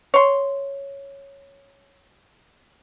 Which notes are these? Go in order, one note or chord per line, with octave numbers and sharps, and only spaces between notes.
C#5 C6